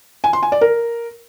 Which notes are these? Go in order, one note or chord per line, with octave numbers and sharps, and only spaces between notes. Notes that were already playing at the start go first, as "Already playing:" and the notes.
G#5
C6
G#5
D5
A#4